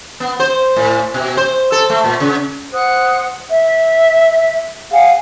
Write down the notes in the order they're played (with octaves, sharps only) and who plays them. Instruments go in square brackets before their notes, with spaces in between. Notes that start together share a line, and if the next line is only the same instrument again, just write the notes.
[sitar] B3
C5
A2
B2
C5
A4
A3
A#2
C#3
[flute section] C5 F#5 D#6 F#6
E5
G#4 F5 F#5